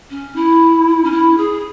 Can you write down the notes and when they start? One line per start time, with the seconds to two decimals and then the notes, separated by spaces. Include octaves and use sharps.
0.10 C#4
0.35 E4
1.04 C#4
1.11 E4
1.37 G#4